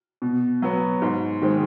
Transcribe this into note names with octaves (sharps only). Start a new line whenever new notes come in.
B2
F#3 B3
G#2
D#3 G#3 C4